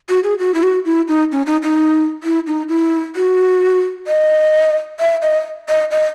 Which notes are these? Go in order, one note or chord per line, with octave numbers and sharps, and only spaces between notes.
F#4
G#4
F#4
E4
F#4
E4
D#4
C#4
D#4
D#4
E4
D#4
E4
F#4
D#5
E5
D#5
D#5
D#5